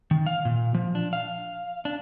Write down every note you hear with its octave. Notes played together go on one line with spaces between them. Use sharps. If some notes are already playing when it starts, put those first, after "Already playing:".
D#3
F5
A#2
F3
D4
F5
D4